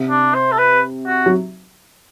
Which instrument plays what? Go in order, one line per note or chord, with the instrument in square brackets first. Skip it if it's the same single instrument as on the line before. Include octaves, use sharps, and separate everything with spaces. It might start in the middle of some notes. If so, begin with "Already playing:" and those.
Already playing: [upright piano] C3
[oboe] D4
C5
A4
B4
F#4
[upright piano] F#3